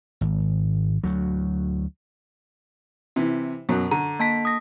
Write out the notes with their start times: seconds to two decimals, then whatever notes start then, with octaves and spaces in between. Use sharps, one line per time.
0.21 G#1
1.03 D2 F#3
3.16 C3 E3
3.69 F#2 B2 F#3 C#6
3.91 D3 A#5
4.20 A#3 A5 B6
4.45 D#6 A#6